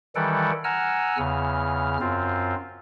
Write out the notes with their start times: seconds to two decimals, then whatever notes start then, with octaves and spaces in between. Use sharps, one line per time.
0.15 D#3 E3 G3 A4 F#5 G5
0.64 F#5 G#5 A#5 E6 F6
1.18 E2 C#3 F6
2.00 F#2 C4 F4